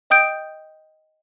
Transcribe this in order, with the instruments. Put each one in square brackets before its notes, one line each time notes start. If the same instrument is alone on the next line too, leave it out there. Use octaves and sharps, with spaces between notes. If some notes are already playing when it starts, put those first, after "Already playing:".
[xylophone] D#5 G5 D#6 G6 D7